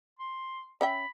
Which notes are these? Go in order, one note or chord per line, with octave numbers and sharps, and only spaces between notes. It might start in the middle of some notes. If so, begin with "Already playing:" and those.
C6
C#4 E5 G5 B5